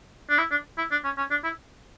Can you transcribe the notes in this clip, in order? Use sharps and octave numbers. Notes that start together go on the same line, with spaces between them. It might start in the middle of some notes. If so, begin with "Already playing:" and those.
D4
E4
D4
E4
D4
C#4
C#4
D4
E4